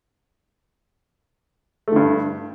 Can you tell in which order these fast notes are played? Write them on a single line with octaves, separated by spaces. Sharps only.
A3 D3 G2